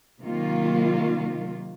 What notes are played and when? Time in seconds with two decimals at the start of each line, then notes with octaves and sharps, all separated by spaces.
0.21 C3 D#3 F#3 A#3 F4